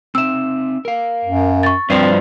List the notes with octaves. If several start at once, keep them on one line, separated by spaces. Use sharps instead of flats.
C4 D#4 E5 E6 E7
A#4 F5
F#2
C#6 A6
G2 F3 C4 B4 D5 C7